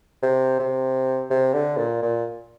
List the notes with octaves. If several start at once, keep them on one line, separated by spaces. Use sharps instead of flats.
C3
C3
C3
D3
A#2
A#2